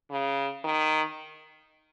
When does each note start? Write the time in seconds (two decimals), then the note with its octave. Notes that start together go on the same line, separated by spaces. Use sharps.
0.11 C#3
0.64 D#3